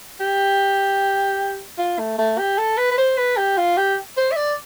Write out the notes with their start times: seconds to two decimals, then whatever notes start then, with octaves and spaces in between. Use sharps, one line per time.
0.20 G4
1.78 F4
1.99 A3
2.18 A3
2.38 G4
2.58 A4
2.77 B4
2.91 B4
2.98 C5
3.17 B4
3.37 G4
3.57 F4
3.77 G4
4.17 C5
4.31 E5
4.36 D5